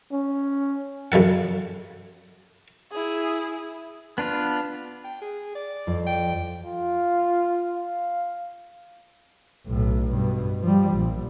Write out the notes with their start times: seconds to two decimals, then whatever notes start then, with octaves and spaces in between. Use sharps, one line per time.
0.12 C#4
1.12 F#2 C#3 A4 F#5
2.92 E4 G#4
4.18 B3 D4 F4 B4
5.05 G5
5.22 G#4
5.55 D5
5.87 F2
6.07 G5
6.64 F4
7.78 F5
9.67 B1 A2
10.11 G2 B2
10.62 F3 G3
10.93 A#1